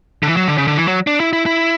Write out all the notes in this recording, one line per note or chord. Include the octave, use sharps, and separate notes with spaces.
D3
E3
F#3
D3
C#3
D3
E3
F#3
D4
E4
E4
E4